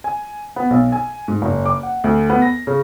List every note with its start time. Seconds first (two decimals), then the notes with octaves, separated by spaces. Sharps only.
0.04 G#5
0.56 B3
0.70 B1
0.92 G#5
1.28 G#2
1.42 F#1
1.66 D6
1.83 F#5
2.04 D2
2.30 B3
2.42 A#6
2.67 C#3